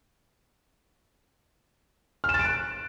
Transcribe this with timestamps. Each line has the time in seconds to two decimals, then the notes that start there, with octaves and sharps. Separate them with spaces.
2.24 F6
2.29 E7
2.34 A6
2.39 D7
2.45 F#6